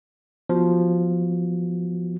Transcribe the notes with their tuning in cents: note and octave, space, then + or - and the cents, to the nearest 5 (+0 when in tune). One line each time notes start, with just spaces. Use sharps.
F3 +0 B3 +0 F#4 +0